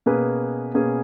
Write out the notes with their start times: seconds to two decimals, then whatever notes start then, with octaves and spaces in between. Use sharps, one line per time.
0.06 B2 A#3 C#4 G#4 B4
0.74 B2 A#3 C#4 G#4 B4